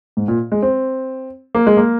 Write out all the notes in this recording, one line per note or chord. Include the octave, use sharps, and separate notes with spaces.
G#2
A#2
G#3
C4
A#3
G#3
A#3